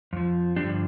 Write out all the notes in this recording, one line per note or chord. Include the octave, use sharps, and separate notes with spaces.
F2 F3
G2 D3 F3 D4 G4